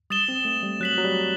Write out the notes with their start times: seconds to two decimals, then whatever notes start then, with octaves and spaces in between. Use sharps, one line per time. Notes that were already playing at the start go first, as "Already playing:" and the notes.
0.10 G3 D#6 A6 E7 G7
0.28 C4
0.45 A3
0.63 G3
0.80 F#3 F#6 B6 F#7
0.98 F#3
1.04 G3